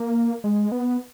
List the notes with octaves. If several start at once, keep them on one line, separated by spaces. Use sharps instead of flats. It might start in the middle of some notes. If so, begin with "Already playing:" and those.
Already playing: A#3
G#3
B3